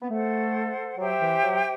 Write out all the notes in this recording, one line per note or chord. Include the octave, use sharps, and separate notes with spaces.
B3
A3 A4 C5 F#5
F#3 G4 C5 E5 G5
E3
F#3